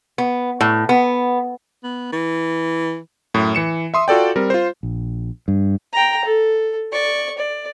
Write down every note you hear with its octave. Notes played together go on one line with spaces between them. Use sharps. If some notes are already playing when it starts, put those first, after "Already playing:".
B3
A2
B3
B3
E3
F#2 A2
E3 C#7 E7
E5 C6 D#6
F4 F#4 A4 D5 G5
G3 C4 A#4
F4 C5
A#1
G2
G5 A#5
A4
D5 C#6
D5